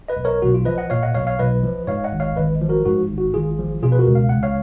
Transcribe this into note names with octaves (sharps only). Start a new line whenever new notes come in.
B4 D#5
B1
A#4 C#5
B1 F#4
F4
F3 B4 D#5
D#5 F#5
A#2 C#5 F5
D#5 F#5
B1 C#5 F5
C#5 F5
B1 B4 D#5
F3
G#2 C#5 F5
D#5 F#5
G#1
C#5 F5
G#1 B4 D#5
F3
F#4 A#4
G#2 F#4
G#1
F#4
G#1 F4 G#4
F3
B2 F4 G#4
B4
F#4 A#4
C#2
F5
C#2 F#5
C#5 F5